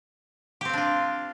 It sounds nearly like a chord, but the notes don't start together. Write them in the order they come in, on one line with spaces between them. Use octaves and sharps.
G4 C4 F5 D4 F4